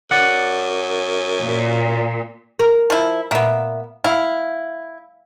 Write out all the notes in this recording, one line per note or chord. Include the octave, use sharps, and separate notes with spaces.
F#2 D5 F#5
A#2
A#4
F3 E4
A#2 A#3 B3 E5
E4 F5